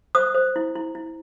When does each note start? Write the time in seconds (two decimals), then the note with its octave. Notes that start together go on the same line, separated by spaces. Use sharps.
0.15 C5 D#6
0.35 C5
0.56 E4
0.76 E4
0.95 E4